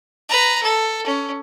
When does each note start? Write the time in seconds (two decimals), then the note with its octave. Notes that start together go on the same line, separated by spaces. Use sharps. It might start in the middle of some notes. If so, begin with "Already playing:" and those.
0.29 B4 A#5
0.63 A4
1.06 C#4